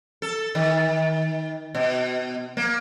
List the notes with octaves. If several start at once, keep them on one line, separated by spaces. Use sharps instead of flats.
A4
D#3
B2
A#3